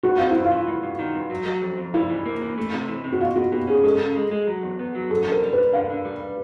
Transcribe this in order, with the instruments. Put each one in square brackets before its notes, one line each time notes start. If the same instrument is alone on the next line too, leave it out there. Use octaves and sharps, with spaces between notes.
[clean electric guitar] G2 [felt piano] F#4
[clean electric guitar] C4 [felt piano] F4
[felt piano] E4
[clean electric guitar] G2
[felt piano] F4
[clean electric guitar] E3
G2
G2
D#3
G2
F#3
F#3
F2
F2
[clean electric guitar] G3 [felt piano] E4
[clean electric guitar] E3
A#3
E3
A3
C3
E3
C3
[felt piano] F#4
[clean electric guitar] B2 [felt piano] F4
[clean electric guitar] B2 [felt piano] F#4
[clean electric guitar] B2 [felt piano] G4
[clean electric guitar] C#4 [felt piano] G#4
[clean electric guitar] G#3 [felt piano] A4
[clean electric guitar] C#3
G#3
G#3
F#3
E2
B3
F#3
[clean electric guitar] F#2 [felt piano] A4
[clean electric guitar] D3
[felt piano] A#4
[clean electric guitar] G3
[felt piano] B4
[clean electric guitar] G3
[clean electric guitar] D3 [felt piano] F5
[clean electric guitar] D3
G3